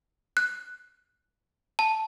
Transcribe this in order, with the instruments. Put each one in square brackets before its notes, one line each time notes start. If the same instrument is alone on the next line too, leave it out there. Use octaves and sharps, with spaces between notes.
[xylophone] F#6
A5